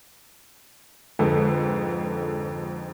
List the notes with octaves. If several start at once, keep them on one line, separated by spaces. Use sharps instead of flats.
F2 G#2 D3 G#4 A4 B4